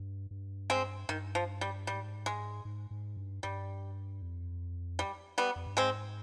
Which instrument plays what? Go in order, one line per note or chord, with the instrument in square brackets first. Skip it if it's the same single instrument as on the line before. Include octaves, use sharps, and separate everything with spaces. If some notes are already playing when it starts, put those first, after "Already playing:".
Already playing: [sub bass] G2
G2
[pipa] G#3 C4
[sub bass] G2 [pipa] D#3
[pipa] F3
G3
[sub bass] G#2 [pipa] G3
[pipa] G#3
[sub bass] G#2
G#2
G2
[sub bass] G2 [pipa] G3
[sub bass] F2
[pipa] G3
G3 B3
[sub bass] F2
G2
[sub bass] G#2 [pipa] G#3 C4